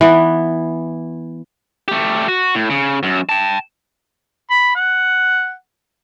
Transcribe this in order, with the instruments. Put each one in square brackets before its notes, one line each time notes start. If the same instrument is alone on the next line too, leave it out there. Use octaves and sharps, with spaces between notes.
[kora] E3 B3
[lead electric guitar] A3 G4
F#4
A2
C#3
F#2
G5 A5
[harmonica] B5
F#5